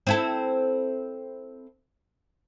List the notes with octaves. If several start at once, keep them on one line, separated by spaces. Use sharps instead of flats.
C4 E4 A4